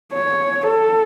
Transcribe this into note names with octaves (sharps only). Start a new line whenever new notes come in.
C#5
A4